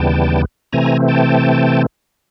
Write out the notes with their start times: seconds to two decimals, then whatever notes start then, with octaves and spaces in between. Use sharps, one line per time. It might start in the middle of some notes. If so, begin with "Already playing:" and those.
Already playing: D#2 C#3 E3 G3 B3 G5 A5
0.73 C3 E3 A3 C4 G#5 A#5
1.08 G5 A5